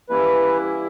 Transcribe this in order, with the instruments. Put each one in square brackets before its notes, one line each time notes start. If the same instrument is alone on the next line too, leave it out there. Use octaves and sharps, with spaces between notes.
[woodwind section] E3 G3 A#3 C#4 E4 [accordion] B4